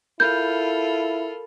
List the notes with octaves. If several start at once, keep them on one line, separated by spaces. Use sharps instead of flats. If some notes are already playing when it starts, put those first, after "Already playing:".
E4 F4 A4 A#4 B5 F6 G6